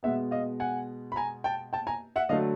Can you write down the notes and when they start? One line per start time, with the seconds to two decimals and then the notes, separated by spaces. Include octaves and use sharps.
0.03 B2 G#3 B3 E5 F#5
0.31 D#5 F5
0.60 F#5 G#5
1.12 B5
1.16 G#5 A#5
1.44 G5 A5
1.73 G5 A5
1.87 G#5 A#5
2.16 E5 F#5
2.29 D3 F#3 A3 D#5 F5